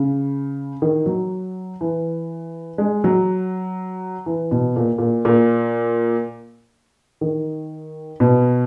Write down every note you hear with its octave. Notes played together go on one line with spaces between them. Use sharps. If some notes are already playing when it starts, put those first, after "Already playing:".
Already playing: C#3
D#3
F#3
E3
G#3
F#3
E3
B2
A#2
A#2
A#2
D#3
B2